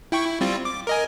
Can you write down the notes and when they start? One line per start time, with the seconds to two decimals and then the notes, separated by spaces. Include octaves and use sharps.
0.12 E4 G5 C#6
0.26 E4
0.41 G3 C4 F4
0.65 D6
0.87 A#4 D#5 G#5